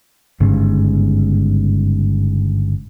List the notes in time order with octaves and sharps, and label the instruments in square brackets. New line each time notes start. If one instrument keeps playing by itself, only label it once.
[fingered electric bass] G1 G#2 C#3